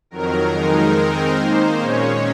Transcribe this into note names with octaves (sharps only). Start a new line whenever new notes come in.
F2 D#3 F#3 A#4
F2 D#3 G#3 D#4
D#3 G#3 C4 D#4 A#4
D#3 A#3 D#4 C5
A#2 G#3 C#4 C#5